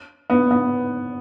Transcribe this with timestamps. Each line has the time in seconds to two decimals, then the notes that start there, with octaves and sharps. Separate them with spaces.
0.30 B3
0.51 B3